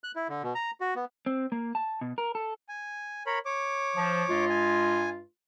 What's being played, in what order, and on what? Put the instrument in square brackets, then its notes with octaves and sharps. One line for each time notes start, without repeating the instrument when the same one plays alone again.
[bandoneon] F#6
E4
D3
B2
A#5
F#4
B3
[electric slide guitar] C4
A#3
A5
B2
A#4
A4
[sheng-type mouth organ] G#5
A#4 C#5 B5
C#5 D6
[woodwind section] F3
G2 G#3 F4
[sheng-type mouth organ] G#5